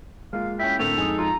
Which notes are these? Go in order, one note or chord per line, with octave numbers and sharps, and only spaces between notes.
G#3 A#3 F4 F5
C#4 E4 G5 B6
A2 D3 A#3 C4 A4 F7
F2 G#3 D#4 G#5 D#6
F4 A#5